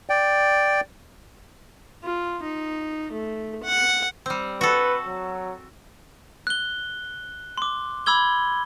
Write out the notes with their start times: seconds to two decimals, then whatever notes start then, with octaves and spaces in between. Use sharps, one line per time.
0.10 D5 G5
2.04 F4
2.43 D#4
3.12 A3
3.63 F#5
4.26 G3 C4
4.61 F#4 A4 B4
5.06 F#3
6.47 F#6 G7
7.58 C6 D6
8.06 B5 D6 E6 G#6 G7